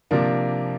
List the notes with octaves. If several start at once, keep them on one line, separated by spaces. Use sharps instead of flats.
C3 F3 A#3 D4